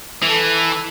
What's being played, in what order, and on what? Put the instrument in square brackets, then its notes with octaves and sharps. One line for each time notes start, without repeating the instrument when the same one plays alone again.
[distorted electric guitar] E3 [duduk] A4